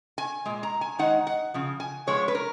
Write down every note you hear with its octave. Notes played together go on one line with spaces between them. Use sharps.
G#5
A#2 G#3
A#5
G#5
D#3 G#3 D#4 F#5
F#5
C#3 F3
G#5
F3 G#3 B3 C#5
B4
A#4